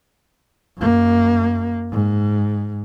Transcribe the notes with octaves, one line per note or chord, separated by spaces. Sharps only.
F#2 A#3
G#2